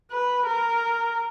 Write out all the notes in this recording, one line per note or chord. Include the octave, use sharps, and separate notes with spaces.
B4
A#4